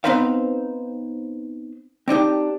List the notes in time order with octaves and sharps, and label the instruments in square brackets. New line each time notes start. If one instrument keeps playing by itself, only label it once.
[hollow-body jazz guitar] B3 C4 D#4 B4 C5 F5
C4 D4 D#4 G4